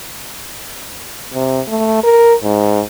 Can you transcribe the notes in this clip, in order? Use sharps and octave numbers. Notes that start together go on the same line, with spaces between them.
C3
A3
A#4
G#2